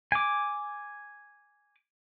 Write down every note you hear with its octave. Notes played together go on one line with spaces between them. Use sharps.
G#5 D6